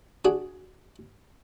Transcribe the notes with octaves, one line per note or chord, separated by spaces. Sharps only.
D4 F#4 G#4